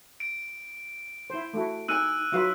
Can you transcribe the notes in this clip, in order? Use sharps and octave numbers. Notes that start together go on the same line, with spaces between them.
D7
E4 C5
A3 E4 F#4
D#4 G#5 E6 F#6 D#7
F#3 D#4 F4 F#4 B4 F5